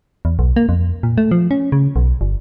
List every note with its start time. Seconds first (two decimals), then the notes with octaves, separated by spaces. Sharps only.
0.25 E2
0.39 B1
0.56 A#3
0.69 F2
1.03 A#2
1.18 A3
1.31 F3
1.51 C#4
1.72 C#3
1.96 B1
2.21 G1